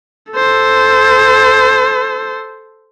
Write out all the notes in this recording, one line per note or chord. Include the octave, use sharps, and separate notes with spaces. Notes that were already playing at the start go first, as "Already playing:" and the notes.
A4 C5